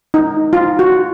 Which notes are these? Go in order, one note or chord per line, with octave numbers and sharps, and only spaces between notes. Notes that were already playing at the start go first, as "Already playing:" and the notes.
D#4
F4
F#4